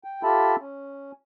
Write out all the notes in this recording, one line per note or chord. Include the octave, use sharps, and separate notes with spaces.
G5
F4 G4 A4 E5 A5 B5
C#4